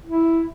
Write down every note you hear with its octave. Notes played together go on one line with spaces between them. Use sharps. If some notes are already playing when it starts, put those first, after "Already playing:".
E4